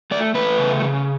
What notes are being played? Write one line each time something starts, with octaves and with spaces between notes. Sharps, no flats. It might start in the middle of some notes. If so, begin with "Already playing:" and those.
A3 D5
A3 B4
C#3
C#3